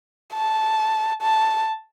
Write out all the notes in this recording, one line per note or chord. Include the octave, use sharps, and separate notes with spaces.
A5
A5